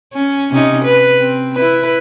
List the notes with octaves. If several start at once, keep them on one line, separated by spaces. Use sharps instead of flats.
C#4
C3 C#4 D#4
B4
C4
E4 B4